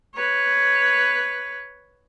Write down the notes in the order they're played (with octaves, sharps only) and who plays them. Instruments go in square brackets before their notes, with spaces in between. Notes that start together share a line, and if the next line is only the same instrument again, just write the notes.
[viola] B4 C#5